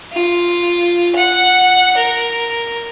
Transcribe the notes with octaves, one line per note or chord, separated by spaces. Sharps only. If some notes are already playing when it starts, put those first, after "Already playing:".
F4
F#5
A#4